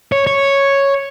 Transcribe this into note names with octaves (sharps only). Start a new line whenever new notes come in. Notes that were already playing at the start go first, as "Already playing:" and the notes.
C#5
C#5